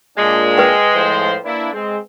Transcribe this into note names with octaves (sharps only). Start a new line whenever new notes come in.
A#2 G#3 D4
B4 G5
A2 F3 C5
A#3 D4 E4
G#3 C4